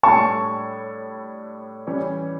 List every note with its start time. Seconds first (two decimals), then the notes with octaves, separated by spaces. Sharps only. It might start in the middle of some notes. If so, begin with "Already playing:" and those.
0.03 A2 G3 D4 A4 C#5 A5 C#6
1.87 E3 G3 C#4 G4 C#5